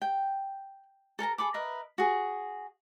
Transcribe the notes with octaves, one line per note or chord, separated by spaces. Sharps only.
G5
A4 A#4 A5 A#5
G#4 A4 B5 D6
A#4 B4 D#5 E5
F#4 G#4